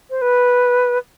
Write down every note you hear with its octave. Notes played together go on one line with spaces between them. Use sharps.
C5
B4